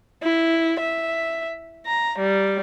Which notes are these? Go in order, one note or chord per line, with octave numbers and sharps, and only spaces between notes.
E4
E5
A#5
G3